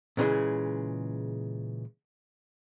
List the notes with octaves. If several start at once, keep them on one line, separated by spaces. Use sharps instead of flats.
A#2 C#3 E3 G#3